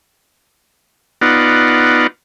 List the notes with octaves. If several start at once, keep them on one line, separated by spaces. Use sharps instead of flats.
B3 D#4 F4 D5 F#5